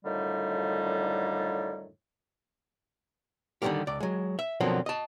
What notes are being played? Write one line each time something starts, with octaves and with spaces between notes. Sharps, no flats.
F#2 A2 D3 D#3 F3 G3
D3 D#3 F3 G3 A#3 G4
C#2 D5
F#3 G#3
E5
B2 D3 F3 F#3 A#3 C4
D#5 A5